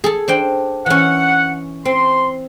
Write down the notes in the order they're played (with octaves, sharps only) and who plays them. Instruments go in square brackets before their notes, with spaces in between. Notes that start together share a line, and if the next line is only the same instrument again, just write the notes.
[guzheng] G#4 A4
D4 C5 G5
[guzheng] E3 C#4 [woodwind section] F#5
[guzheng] C4 [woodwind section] C6